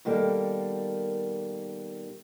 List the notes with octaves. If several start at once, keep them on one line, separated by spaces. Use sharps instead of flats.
B2 D#3 G3 A#3 A4